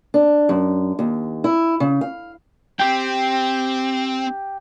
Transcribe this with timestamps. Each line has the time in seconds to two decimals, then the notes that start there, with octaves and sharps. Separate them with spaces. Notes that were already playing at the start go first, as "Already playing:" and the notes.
0.14 D4
0.49 F#2
0.99 D#2
1.44 E4
1.80 C#3
2.01 F5
2.79 C4 G4 G5